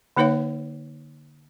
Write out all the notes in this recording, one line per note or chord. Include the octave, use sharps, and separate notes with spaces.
D3 A#3 D#4 B4 C#5 F5